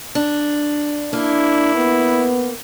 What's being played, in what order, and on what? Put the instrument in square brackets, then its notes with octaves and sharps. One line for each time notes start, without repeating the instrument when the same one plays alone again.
[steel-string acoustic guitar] D4
[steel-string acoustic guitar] A#3 [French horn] D4 [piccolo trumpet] E4
[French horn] B3